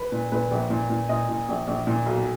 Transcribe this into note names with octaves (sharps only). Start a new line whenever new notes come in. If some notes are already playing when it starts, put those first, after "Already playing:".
Already playing: B4
A#2
A#2 B4
A#1
A#2
A#2
A#2 D#5
A#2
A#1
A#1
A#2
B1